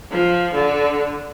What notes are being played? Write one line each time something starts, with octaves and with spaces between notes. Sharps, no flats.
F3
D3